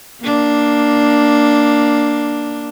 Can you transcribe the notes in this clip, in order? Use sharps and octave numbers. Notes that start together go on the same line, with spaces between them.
A#3 D4